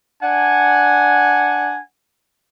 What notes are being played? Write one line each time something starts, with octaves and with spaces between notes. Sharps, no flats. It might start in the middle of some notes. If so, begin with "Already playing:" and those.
D4 F#5 G#5